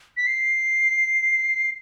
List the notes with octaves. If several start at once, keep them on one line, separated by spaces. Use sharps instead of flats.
B6
C7